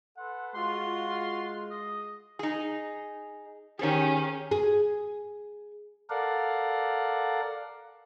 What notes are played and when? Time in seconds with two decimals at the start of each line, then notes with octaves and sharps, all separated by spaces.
0.17 A4 B4 F#5 C6
0.55 G#3 F4 F#4 C6
1.71 D#5
2.39 D#4 G#4
3.79 D#3 C#4 G4 G#4
4.51 G#4
6.10 A4 A#4 D5 F5 F#5